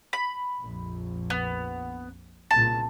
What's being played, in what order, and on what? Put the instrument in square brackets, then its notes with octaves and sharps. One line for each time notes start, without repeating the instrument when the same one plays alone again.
[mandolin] B5
[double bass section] A#1 F2
[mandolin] B3
[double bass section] C2 A#2 C#3 [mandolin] A5